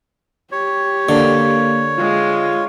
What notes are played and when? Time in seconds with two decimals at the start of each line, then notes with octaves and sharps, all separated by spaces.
0.52 G4 C#5
1.09 D3 A#3
1.98 G#3 F4